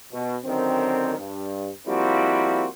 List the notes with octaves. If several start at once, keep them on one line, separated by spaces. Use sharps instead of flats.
B2
F#2 D3 D#3 C4
G2
F3 G3 A#3 C4 E4 F#4